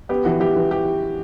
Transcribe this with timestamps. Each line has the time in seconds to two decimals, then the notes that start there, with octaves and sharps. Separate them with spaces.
0.09 B3 G4
0.25 E3 F#4
0.40 E3 G4
0.56 E3
0.71 G4